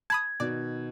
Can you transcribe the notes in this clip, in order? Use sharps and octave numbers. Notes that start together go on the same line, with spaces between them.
A5 B5 D#6 G#6
B2 D#3 D5